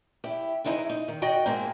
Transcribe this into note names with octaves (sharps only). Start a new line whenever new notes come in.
E4 G4
G#2 E3 D#4 E4 G#4
D#4
D#3
F#4 D5 D#5 G5
G#2 G#3 A#3 C4 G#4